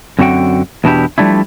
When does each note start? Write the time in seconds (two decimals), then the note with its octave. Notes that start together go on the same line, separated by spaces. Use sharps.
0.19 F#2 D3 C4 F#4 F#5 G5
0.84 E2 B2 D4 E4 G4
1.18 F3 G3 A3 D4 E4